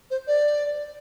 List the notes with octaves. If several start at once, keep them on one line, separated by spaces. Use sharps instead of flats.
C5
D5